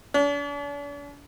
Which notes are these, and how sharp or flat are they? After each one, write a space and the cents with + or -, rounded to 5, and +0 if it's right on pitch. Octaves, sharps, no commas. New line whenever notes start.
D4 -45